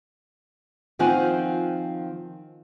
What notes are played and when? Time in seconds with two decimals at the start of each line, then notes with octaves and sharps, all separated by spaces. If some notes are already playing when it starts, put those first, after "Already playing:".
0.99 D#3 F3 C4 F4 F#5 G#5